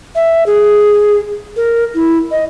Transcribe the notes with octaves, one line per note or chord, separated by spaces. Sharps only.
E5
G#4
A#4
E4
D#5